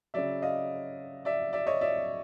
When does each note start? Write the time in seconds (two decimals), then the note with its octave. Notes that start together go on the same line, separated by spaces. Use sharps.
0.14 C#3 F#3 D5 E5
0.42 D#5 F5
1.25 D5 E5
1.53 D5 E5
1.67 C#5 D#5
1.81 D5 E5